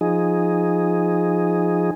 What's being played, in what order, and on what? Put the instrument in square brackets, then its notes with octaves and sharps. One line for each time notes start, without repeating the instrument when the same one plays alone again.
[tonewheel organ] F3 D#4 G#4